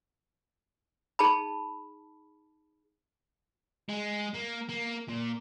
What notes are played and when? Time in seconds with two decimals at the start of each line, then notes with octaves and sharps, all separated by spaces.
1.19 D#4 G#4 A5 B5
3.89 G#3
4.34 A#3
4.69 A#3
5.08 A#2